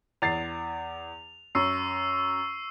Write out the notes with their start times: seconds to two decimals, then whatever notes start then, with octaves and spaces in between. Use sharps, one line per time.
0.22 E2 A6 C7 F7
1.55 F#2 C#6 E6 C7